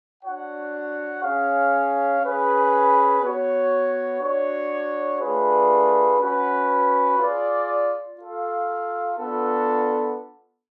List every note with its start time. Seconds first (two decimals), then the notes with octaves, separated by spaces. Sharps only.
0.23 D4 F#4 C#5 F#5
1.22 C#4 G#4 C#5 F5
2.22 C#4 G#4 B4
3.21 B3 F#4 C#5
4.20 D4 F#4 C#5
5.20 A3 D4 F4 G#4 B4
6.19 C#4 F#4 B4 F#5
7.18 F4 G#4 D5
8.18 F4 A4 F5
9.17 B3 D4 F4 A4